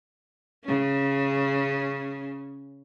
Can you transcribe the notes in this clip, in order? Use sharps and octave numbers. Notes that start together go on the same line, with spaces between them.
C#3 C#4